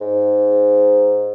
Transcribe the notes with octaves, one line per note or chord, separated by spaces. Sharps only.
G#2